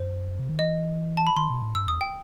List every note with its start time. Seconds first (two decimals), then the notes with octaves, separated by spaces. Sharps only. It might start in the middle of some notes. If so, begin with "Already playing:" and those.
Already playing: F#2 C5
0.39 C3
0.49 D#3
0.59 E3 D#5
1.17 A5
1.27 B5
1.36 D#3 C6
1.50 B2
1.62 A2
1.75 G2 E6
1.87 E2 D#6
2.01 G5